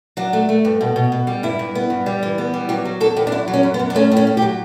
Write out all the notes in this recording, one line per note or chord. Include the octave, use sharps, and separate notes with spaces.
F#3 D4
A3
A3
G2
B2
B2
B2
G3
G2 E4
G2
B3
G2
G3
E3
B3
G3
F#3 G4
F#3
E2 A4
E2 G4
D4
F#2 E4
F#3
C#4
F#2
B3
F#2
D4
A3 C#4
A2
C#4
A2
G4
F#3